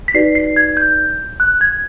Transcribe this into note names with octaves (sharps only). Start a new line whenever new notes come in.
B6
D#4 F#4 B4 D5 C7
C7
G#6
G6
F#6
G#6